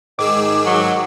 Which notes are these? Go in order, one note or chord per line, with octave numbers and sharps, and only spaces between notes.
G#2 D#3 G#4 D6 E6
F#3